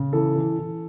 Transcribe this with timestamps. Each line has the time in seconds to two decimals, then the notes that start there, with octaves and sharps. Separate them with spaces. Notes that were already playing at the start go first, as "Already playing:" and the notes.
Already playing: C#3
0.13 E3 A4
0.36 E3
0.59 E3